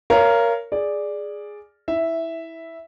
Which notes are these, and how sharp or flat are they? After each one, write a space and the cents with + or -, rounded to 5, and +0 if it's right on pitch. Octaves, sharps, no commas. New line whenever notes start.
A#4 +0 C#5 +15 F5 -25
G#4 +0 D5 +0
E4 -15 E5 +0